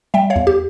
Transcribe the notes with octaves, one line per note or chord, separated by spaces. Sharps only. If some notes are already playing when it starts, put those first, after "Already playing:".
G3 E5 G5
C#5 F5
E2
G4